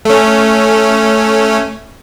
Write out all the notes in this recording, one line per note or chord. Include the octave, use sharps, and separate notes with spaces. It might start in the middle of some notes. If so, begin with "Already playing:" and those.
A3 C#4